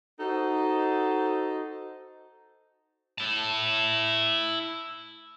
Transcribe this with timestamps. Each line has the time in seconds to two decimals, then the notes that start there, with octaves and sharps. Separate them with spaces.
0.20 D#4 F#4 A4 C5 D#5
3.18 E4 A5